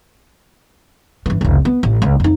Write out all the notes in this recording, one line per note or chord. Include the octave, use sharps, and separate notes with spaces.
G1 E3
F1 C#2
B3
A1
C#2
F2 D#4